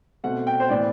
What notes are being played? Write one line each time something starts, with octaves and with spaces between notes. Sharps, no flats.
B2 A3 C4 F#5
G5
C5
A2 E3 B3 D5